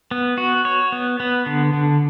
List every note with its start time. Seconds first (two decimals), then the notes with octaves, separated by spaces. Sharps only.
0.11 B3
0.38 F#4
0.65 C#5
0.92 B3
1.20 B3
1.46 D3
1.73 D3